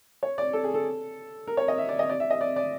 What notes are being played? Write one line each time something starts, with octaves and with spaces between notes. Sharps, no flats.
C#5
D5
A4
G#4
A4
A#4
C#5
D#5
E5
D5
D#5
D5
E5
D#5
D5
D5